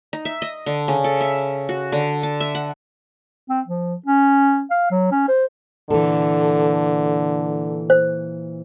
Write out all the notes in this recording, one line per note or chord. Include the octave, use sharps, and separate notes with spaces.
D#4
E5
D#5
D3
C#3
A4
E5
F#4
D3
A5
E5
F#5
C4
F3
C#4
F5
F#3
C#4
C5
A#2 D3 E3 A4
C5